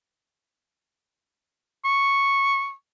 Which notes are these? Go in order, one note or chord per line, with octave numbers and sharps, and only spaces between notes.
C#6